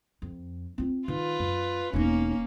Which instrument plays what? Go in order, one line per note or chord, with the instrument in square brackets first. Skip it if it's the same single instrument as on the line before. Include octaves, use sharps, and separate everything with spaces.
[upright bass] F2
C4 F4
[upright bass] D#3 [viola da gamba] F4 B4
[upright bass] F#2
[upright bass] E1 D#4 [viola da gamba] A#3 C#4